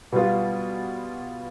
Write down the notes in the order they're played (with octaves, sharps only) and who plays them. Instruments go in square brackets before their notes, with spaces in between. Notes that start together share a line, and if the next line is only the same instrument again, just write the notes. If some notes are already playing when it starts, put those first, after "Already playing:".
[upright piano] B2 G3 B3 F4